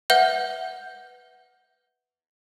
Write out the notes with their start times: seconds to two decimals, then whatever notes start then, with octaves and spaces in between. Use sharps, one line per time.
0.10 B4 E5 F#5 G6